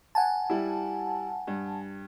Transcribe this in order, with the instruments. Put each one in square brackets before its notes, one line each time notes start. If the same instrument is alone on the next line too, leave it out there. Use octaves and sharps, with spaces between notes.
[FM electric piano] F#5 G#5 A5
[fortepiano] G3 E4
G2